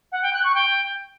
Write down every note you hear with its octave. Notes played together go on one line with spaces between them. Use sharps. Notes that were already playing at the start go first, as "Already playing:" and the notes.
F#5
G5
F#6
C#6
G5